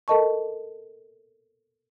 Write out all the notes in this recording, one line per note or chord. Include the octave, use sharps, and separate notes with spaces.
A4 A#4 D#5 A5 C#6